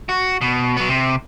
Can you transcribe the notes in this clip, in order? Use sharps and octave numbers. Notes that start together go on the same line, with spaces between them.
F#4
B2
F#3 B3
C3